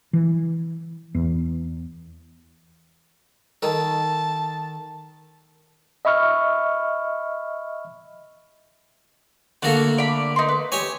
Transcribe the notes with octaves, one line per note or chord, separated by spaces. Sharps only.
E3
E2
D#3 A4 A5
D#5 E5 B5 C#6 F6 C#7
D3 A3 A#3 D4 F#4 A4
D5 B5
D#4 B4 C6
B4
G4 C#5 G#5